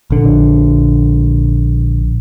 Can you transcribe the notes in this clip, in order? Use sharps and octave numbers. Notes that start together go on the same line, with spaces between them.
A#1 D3